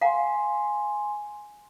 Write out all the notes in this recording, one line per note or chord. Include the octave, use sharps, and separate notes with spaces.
F5 F#5 G#5 A#5 C6